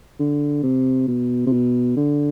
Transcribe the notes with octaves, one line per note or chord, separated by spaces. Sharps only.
D3
C3
B2
C3
B2
D3